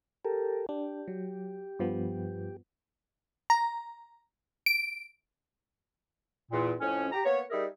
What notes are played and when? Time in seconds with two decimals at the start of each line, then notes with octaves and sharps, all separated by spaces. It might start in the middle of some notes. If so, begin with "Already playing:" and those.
0.25 G4 A4 A#4
0.69 D4 G4
1.08 F#3
1.79 G2 F3 B3
3.50 A#5
4.66 D7
6.51 E2 A#2
6.80 F2 A2 C#4
7.12 G4 A#5
7.25 A#3 B3 C#5
7.50 G3 D#4 G#4 A#4 E5